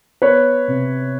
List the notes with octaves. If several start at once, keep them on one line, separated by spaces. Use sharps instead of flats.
B3 B4 C#5
C3